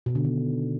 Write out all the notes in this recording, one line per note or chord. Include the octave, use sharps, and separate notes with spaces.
B2
D3
D#3